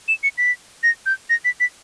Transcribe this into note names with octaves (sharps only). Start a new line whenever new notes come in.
E7
C#7
B6
A#6
G6
A#6
B6
B6